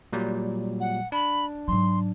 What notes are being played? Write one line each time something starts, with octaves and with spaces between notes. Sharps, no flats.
A#2 F#3 G3
F#5
D4 B5
G#2 F#3 C6